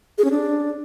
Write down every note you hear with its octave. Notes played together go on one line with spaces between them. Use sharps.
G#4
C#4
D4